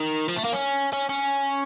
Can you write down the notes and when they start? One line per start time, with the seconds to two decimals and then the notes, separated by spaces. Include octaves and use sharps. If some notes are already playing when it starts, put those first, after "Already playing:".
Already playing: D#3
0.28 F3
0.37 A3
0.44 A#3
0.53 C#4
0.93 C#4
1.09 C#4